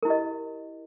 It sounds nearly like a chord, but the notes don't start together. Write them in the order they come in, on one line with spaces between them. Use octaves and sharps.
A#4 E4 G4 D#5